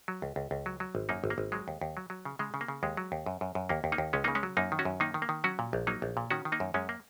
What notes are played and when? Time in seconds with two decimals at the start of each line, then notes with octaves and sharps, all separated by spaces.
0.08 F#3
0.22 C#2
0.36 C#2
0.51 C#2
0.66 F#3
0.80 F#3
0.95 G#1
1.09 F#2 A#3 D#4
1.24 G#1
1.30 A#3
1.38 G#1
1.52 F#3 G#3
1.68 D#2
1.81 D#2
1.97 F#3
2.10 F#3
2.25 C#3
2.39 C#3 G#3
2.54 C#3
2.61 A#3
2.68 C#3
2.83 D#2 G#3
2.97 F#3
3.12 D#2
3.26 F#2
3.41 F#2
3.55 F#2
3.69 D#2 A#3
3.84 D#2
3.92 A#3 D#4
3.98 D#2
4.13 C#2 G#3 C#4
4.24 C#3 A#3 D#4
4.35 G#3 C#4
4.43 F#3
4.57 F#2 A#3 D#4
4.72 D#3
4.79 C#4 F#4
4.85 F#2
5.00 D#3 A#3 D#4
5.14 D#3
5.22 A#3
5.29 D#3
5.44 F#3 C#4 F#4
5.59 A#2
5.73 A#1
5.87 F#3 A#3 D#4
6.02 A#1
6.17 A#2
6.31 D#3 C#4 F#4
6.45 D#3
6.52 A#3 D#4
6.60 F#2
6.74 F#2 G#3 C#4
6.89 A#3